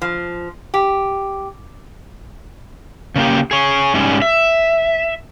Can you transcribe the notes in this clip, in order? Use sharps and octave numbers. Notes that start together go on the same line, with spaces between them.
F3
G4
C#3 A#3 G4
G#4 C#5
G#2 C#3 G3 C#4
E5